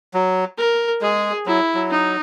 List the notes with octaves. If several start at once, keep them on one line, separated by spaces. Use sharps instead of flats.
F#3
A#4
G#3 G#4
F#3 E4
F#3
D#4